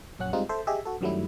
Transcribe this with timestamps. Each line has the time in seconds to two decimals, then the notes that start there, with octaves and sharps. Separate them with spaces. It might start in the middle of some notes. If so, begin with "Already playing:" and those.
0.19 A#1 F#2 C#4 F#5 F#6
0.33 G3 G#3 C4 D#4 F4
0.49 A4 C5 E5
0.67 G4 G#4 D#5 E5
0.85 F#4 A4
1.01 F#2 D#3 F#3 G3 A3 E4